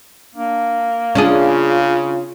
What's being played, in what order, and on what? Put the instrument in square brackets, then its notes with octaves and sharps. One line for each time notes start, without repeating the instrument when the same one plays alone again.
[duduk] A#3 [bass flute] D4
[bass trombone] C#3 [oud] C#4 D4 G#4 [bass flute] F4